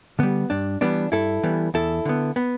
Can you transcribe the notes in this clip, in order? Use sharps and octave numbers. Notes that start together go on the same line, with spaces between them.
D3 G3 B3
G2 D4
E3 G3 B3 D4
G2 E4 A4
E3 G3 B3
E2 E4 A4
D3 B3
B3